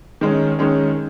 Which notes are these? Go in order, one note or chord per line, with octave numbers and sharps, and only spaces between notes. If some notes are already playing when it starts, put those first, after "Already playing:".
D#3 G#3 C#4
D#3 G#3 C#4